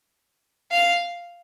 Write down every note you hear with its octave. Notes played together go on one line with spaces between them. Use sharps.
F5